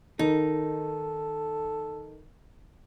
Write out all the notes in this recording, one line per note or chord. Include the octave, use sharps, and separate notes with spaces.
D#3 D#4 A4 A#4